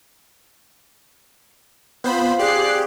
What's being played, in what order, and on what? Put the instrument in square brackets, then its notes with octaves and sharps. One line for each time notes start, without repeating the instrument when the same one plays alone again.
[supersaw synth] B3 C5 B5 [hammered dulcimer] C4 F4 G#5
[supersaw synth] G4 [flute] G#4 [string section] D5 F#6 C7